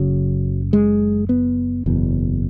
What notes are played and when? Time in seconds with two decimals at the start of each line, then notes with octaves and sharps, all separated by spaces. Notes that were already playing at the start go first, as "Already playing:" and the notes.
Already playing: F#1 F#2 C#3 F#3
0.73 G#3
1.29 B3
1.86 F#1 E2 B2